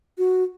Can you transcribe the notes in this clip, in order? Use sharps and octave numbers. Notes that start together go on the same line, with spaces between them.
F#4